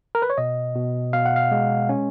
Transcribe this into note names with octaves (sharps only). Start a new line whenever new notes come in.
A#4
B4
C#5
B2 D#5
B2
B2 F5
F#5
F5
G#3
C#4